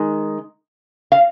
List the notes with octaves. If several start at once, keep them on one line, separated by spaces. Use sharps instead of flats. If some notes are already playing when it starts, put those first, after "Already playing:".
Already playing: D#3 G#3 D#4
F5